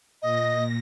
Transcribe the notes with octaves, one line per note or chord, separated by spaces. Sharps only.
A#2 D#5 A#6